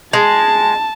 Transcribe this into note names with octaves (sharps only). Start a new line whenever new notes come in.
G#3 A5